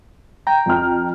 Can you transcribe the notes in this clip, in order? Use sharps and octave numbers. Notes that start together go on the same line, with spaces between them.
G5 A#5
F2 F6